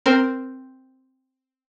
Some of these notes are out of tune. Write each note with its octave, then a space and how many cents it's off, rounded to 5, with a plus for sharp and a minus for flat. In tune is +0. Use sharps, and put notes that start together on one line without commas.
C4 +0 A#4 +0